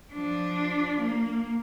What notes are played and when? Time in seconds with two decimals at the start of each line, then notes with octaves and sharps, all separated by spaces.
0.13 F3 D4
1.01 A#3